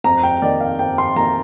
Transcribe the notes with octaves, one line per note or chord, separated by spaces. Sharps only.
F2 A#5
G5
D#3 A#3 D#4 D5
F5
F2 G5
C6
D#3 A#3 D#4 A#5